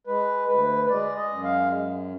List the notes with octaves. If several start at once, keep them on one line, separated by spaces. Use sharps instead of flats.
G#3 B4
D2 B4
B4
G#3 D5
D#5
F#2
F5